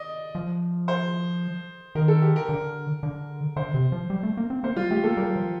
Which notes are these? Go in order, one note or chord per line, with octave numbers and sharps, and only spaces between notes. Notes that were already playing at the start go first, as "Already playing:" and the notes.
Already playing: D5 D#5
F3
C5
D#3 A#4
A4
G4
A#4
D3
D3
D3 C5
C3
F3
G3
A3
A#3
C4
A#3 C5
G3 F4
A3 G4
A#3 A4
G3 A#4
F3